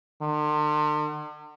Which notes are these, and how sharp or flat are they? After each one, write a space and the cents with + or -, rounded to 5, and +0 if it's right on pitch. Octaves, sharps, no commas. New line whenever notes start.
D3 +45